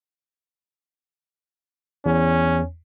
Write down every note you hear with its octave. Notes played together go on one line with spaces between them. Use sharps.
E2 C#4